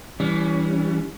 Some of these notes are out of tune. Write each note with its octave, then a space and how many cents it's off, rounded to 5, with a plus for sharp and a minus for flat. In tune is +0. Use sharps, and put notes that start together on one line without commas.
E3 +0 G3 +0 C#4 +30